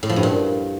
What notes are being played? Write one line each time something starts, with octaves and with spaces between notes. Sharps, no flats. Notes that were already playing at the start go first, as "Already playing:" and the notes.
A2
F3
G2
A#2